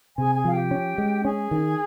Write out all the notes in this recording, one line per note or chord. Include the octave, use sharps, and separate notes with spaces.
C3 G#4 G#5
G#4 G#5
F3 F5
G4 G5
C#4
G#3
C#4 G#4 G#5
D#3